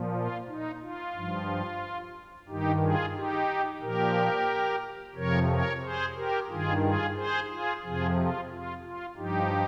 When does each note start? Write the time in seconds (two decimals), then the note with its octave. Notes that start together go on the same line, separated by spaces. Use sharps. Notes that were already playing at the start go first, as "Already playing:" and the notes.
Already playing: A#2 F3
0.14 F4
0.48 D#4
0.81 F4
1.15 G2 F3
2.48 G2 D#3 D#4 G4
2.82 F4 G#4
3.15 D#4 G4
3.82 A#2 F3 G4 A#4
5.15 F2 C3 F3 A#4 C#5
5.49 A#4 C#5
5.82 G#4 C5
6.16 G4 A#4
6.49 G2 D#3 F4 G#4
6.82 F4 G#4
7.16 G#4 C5
7.49 F4 G#4
7.83 F2 C3 F3 F4 G#4
8.17 F4
8.50 F4
8.83 F4
9.16 G2 F3 D#4 G4